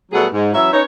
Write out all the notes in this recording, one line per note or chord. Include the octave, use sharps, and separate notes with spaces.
B2 F#3 G3 A3 G#4 F#5
G#2
E3 F#3 C#4 E5
C#4 D#4 B4 C#5